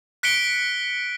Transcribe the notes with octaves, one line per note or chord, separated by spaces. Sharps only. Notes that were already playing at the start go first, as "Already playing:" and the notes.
F#6 B6 C#7 D7 G7